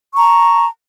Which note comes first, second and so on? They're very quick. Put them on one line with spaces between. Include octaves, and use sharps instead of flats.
C#6 A#5 A5